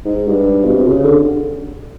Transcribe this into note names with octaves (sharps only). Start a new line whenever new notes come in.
G#2
G2
B2
C3
C#3
D3